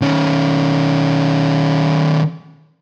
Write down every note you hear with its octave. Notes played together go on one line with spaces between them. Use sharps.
D#3 C#4